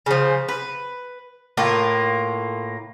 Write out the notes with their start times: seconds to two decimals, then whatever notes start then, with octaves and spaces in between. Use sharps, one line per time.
0.06 C#3 F3
0.49 B4
1.57 A2 A#3 F4